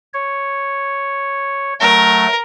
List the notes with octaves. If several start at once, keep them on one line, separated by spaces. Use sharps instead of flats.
C#5
F#3 A3 A#4